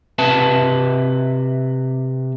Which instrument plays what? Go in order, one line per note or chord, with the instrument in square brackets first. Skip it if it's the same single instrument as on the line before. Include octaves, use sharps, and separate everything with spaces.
[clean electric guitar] C3 B4 E5 A5